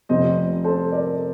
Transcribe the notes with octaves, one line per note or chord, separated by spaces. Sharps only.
F1 F2 C3 C5 D#5
A4 C5
A#4 D5